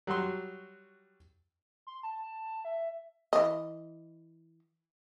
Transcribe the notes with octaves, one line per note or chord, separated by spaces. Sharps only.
F#3 G3 F#4 C6
C6
A5
E5
E3 D#5